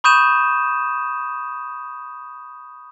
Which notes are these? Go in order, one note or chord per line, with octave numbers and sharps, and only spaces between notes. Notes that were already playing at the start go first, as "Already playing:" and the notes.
B5 C#6 D#6 G6 D#7 E7